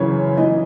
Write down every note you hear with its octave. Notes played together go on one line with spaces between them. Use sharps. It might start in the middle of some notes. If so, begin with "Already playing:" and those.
Already playing: F#2 C#3 E3 C#5
E3 D#5